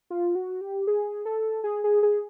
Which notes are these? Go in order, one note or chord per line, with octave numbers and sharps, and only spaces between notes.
F4
F#4
G4
G#4
A4
G#4
G#4
G#4